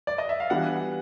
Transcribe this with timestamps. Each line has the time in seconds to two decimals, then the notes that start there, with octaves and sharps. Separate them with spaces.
0.07 D5
0.18 D#5
0.29 E5
0.40 F5
0.50 E3 G3 B3 D4 F#5